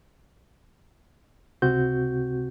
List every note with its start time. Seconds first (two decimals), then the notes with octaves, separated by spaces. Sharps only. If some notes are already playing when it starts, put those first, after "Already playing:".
1.62 C#2 C3 C4 F#4 G6